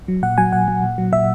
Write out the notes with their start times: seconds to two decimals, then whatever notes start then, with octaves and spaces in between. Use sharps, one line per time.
0.08 F#3
0.22 A#2 F#5
0.38 F#3 G#5
0.53 A#2 F#5
0.68 F#3
0.83 A#2
0.98 F#3
1.13 A#2 E5